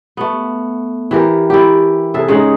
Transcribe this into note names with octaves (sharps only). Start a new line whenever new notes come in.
A3 B3
E3 G4 A#4
E4 G4
C3 G#4 A4 E5
C#3 G#3 D#4 F#5